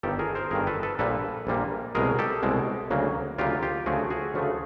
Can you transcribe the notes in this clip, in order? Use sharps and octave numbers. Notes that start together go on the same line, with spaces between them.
G1 G2 D#3 G4 A4
G#4 A#4
A#4 C5
G1 G2 D#3 G#4 A#4
A4 B4
A4 B4
A#1 A#2 G3 A#3 A4 B4
A#1 A#2 G3 A#3
C2 B2 G#3 G#4 A#4
G4 A4
C2 B2 G#3
D2 C#3 F#3 A#3
D2 C#3 F#3 A#3 F4 G4
F4 G4
D2 C#3 F3 A3 F#4 G#4
F#4 G#4
D2 C#3 F3 A3